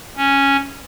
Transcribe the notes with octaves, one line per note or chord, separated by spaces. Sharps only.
C#4